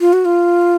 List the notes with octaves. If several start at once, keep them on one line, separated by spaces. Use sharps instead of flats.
F4
F#4
F4